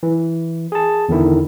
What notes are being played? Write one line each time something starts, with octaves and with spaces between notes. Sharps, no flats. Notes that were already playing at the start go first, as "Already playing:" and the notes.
E3
G#4 A5
E2 D3 D#3 E4